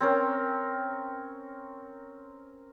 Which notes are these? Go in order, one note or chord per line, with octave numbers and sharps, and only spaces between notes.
C4 C#4 A#4